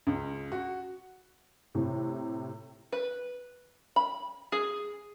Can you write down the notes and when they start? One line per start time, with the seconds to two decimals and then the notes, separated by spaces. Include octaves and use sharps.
0.07 C#2
0.52 F#4
1.75 A2 C3
2.93 B4
3.96 B5
4.52 G#4